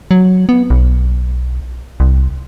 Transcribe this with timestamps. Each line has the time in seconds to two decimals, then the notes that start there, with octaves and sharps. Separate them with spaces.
0.11 F#3
0.49 B3
0.70 B1
2.00 C2